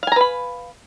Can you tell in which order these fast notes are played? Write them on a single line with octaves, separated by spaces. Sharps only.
F5 G#5 A#5 B4 B5